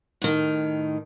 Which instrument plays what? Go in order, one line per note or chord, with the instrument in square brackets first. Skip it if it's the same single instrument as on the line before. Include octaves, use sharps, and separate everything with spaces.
[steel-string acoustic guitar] A2 D#3